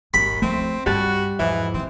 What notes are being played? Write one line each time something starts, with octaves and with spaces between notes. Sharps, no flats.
G#1 D#2 B5
C#2 F3 A3 C4
G2 G3 F#4 G4 A5
E2 G#2 E3 F3 E5
D#3 C4